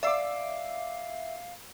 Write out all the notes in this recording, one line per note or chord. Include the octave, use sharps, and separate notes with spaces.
D5 E5 F5 D6 E6 C7